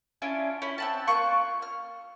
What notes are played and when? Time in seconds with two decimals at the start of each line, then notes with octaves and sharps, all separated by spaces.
0.22 C#4 D4 E4 F4
0.62 C#4 E4
0.78 C4 F#5 A5
1.07 A#3 F4 C#6 F#6
1.62 F6